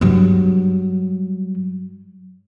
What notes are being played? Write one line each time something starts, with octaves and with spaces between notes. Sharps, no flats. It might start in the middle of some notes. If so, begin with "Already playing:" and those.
G2 F#3